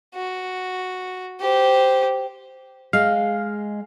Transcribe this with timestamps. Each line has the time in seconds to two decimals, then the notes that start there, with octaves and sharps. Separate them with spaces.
0.15 F#4
1.41 G4 C5
2.93 G#3 F5